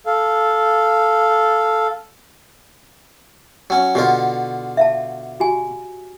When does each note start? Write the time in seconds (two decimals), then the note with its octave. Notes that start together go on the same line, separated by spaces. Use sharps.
0.06 A4 F5
3.70 F#3 C#4
3.95 B2 D3 F4 G4
4.77 E5 F5 A5
5.40 F#4 G4 G#5